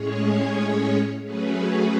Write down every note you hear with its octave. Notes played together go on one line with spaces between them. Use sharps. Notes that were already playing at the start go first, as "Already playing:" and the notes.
Already playing: A2 G#3 C#4 G#4 C#5
F#3 A3 C#4 G#4 B4